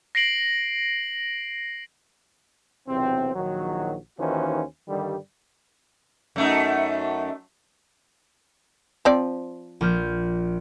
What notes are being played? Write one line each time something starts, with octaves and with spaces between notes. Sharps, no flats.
A#6 C7 D7 F#7
B1 E2 C3 C4
A#1 D#3 F#3
D#2 D#3 E3 C#4 F#4 C5
G2 D3 D#3 G3
F#2 A3 D#4
F3 C4 D5
A#1 F6 G6